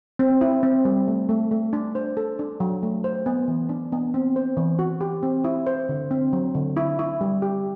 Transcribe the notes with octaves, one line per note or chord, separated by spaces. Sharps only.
C4
E4
C4
G3
A3
A3
A3
D4
C5
A4
D4
F#3
A3
C5
B3
E3
D4
B3
C4
C5
E3
F#4
G4
C4
E4
C5
D3
C4
F#3
D3
E4
E4
G3
G4